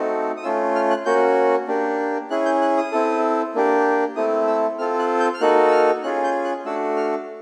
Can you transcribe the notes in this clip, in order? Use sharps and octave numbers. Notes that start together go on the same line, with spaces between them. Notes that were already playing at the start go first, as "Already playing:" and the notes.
Already playing: A3 C4 D#4 F#4 A4
D#6
A3 C#4 F4 E6
F6
F#6
A#3 C#4 F#4 G6
A#3 D4 G4
C#4 E4 G#4 F#6
G6
F#6
D#6
C4 E4 A4
A#3 D4 G4
A3 C4 E4 A4 D#6
E6
C4 F4 A4 F6
F#6
G6
F6
A#3 D#4 F#4 A4 F#6
E6
F6
C#4 F4 G#4 F#6
G6
F#6
A3 D4 F#4 A4 E6
F6